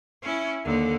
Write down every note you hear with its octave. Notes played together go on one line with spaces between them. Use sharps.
C#4 E4
D#2 D3